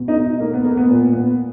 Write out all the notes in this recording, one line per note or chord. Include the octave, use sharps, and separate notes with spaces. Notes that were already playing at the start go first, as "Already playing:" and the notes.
Already playing: B2
D#4
A#3
B3
A#3
B3
A#2 B3
B3